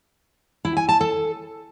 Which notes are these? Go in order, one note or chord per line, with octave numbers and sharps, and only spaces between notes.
E4
G#5
A5
A4